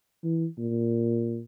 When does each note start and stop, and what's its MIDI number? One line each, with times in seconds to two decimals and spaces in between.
0.24 0.46 52
0.58 1.40 46